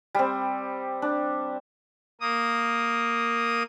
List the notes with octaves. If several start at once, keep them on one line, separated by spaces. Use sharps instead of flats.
G3 C4
D4
A#3 D#6